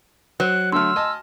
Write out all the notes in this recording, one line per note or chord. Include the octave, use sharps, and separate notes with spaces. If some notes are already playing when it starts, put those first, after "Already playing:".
F#3 C5 F#6
D3 A3 C6 E6 F6
D#5 G#5 A5